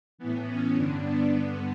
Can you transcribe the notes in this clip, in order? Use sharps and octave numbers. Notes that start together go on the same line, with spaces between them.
A2 E3 B3
C#4
G2 D3 D4
B3
G2 D3